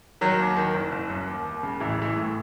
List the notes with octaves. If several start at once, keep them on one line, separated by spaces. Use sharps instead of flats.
D#3 F#3
D#2
D#3
F#1
F#1
F#2
D#2
D#2
C#3
A1 E3
A1 E3
A2